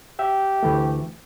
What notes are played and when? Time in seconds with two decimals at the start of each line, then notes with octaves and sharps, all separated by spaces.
0.19 G4 E5
0.63 D2 E3 A3